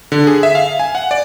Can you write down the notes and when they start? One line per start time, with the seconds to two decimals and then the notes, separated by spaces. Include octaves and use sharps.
0.12 D3
0.27 G#4
0.43 E5
0.55 F5
0.79 G#5
0.95 F#5
1.11 D5